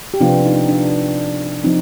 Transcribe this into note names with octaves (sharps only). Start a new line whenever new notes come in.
G4
C3 F3 B3 D4 F4
D#4
D4
F3 C4 D#4